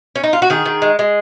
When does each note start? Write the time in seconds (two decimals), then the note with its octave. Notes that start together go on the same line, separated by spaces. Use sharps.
0.16 C#4
0.24 D#4
0.33 F4
0.42 F#4
0.50 D#3 G#4
0.65 D#3
0.82 G#3
0.99 G#3